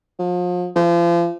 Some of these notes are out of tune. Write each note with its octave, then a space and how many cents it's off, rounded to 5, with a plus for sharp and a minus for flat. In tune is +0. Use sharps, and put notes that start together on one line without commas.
F3 +35
F3 -35